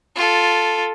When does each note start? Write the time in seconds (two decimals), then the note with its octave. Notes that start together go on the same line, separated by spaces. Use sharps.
0.16 F4 A4